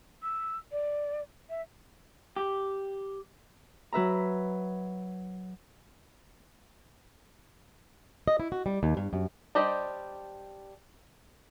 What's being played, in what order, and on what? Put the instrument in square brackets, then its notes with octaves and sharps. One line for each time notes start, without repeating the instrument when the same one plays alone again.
[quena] E6
D5
E5
[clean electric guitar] G4
[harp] F#3 B4 E5 A#5
[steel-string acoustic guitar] D#5
E4
F#4
G3
D#2
G2
F#2
[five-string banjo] G3 D4 G4 C5 D#5